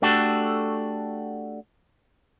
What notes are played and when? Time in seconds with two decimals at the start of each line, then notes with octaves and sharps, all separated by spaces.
0.02 A3 D4 F#4 G4 A4